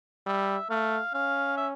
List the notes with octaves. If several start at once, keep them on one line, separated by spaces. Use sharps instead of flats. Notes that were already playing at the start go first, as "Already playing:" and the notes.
G3 E5
A3 F5
C#4 F5
E5